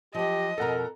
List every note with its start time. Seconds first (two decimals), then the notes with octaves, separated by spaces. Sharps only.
0.15 F3 F#3 G4 D#5
0.58 F2 B2 A4 A#4 F#5 A#5